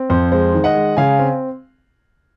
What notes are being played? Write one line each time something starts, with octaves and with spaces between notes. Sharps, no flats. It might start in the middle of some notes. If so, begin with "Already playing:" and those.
Already playing: C4
F2 C5
G#3 C5
D#3
D#5 F#5
G#3
C#3 F5 G#5
C4